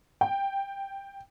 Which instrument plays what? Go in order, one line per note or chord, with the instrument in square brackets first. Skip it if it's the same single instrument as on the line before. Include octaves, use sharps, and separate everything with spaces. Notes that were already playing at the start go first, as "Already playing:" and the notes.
[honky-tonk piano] G5